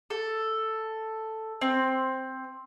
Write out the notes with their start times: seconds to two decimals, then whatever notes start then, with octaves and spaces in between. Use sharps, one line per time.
0.10 A4
1.61 C4